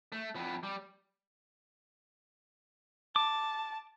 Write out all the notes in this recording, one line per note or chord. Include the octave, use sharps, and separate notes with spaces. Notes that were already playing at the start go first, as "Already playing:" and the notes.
A3
F2 B3
G3
A5 D6